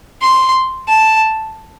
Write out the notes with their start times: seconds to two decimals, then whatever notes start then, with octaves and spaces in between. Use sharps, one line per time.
0.21 C6
0.88 A5